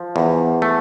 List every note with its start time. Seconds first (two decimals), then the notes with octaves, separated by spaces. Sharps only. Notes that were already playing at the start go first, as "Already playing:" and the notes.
Already playing: F3
0.16 E2
0.62 A3